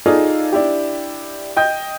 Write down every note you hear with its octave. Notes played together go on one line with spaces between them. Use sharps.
D#4 F4 G#4 A4 D5 F5
D4 E4 G4
D#5 G5 G6